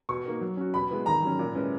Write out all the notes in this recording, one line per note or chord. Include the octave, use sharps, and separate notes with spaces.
B2 C#6
A#3 D#4 A#4
F#3
C#4 F#4
B2 B5
G#3 B3 E4 B4
D#3 A#5
F#3 C#4
A#2
G#3 C#4 E4 B4